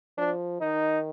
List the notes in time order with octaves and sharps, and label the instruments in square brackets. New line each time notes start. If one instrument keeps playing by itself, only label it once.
[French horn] F3 [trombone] D4
[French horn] D#3 [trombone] D#4